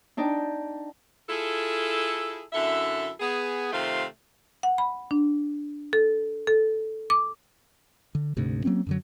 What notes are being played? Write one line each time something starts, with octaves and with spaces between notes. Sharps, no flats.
D4 D#4 D5 G5
E4 F4 G#4 A4
F#2 D3 E4 A4 E5
B3 G#4
C3 D#3 A3 F4 C5 F5
F#5
B5
D4
A4
A4
D6
D3
D2 G#2 C3
F#3 A#3 C4 C#4
F#2 D3 F#3